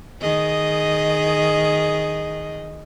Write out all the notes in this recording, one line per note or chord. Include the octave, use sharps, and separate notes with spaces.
D#3 G#4 D#5